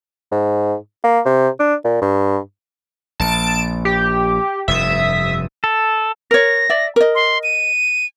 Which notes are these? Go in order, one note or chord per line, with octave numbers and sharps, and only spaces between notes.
G#2
A#3
C3
D4
A#2
G2
A#1 A5 D7
G4
F1 G2 E5 D#6
A4
A#4 C#5 A#6
D5 E5
A#4 D#5
C6
D#7